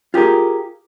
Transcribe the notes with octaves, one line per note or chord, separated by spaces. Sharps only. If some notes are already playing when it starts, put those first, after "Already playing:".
F4 G4 G#4 A#4